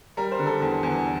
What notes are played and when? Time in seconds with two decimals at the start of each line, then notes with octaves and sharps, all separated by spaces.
0.17 G3 A#4
0.31 C5
0.39 D3
0.46 A4
0.61 E2
0.83 E2